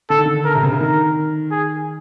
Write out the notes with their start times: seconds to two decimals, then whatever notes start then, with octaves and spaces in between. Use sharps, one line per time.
0.10 D3 A4
0.18 D#3
0.26 D3
0.45 A#4
0.55 C3
0.63 C#3
0.72 D3
0.80 D#3 A#4
1.51 G#4